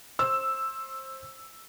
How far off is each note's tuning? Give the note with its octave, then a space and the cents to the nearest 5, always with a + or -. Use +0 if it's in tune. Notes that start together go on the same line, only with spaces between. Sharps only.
C5 +20 E6 +0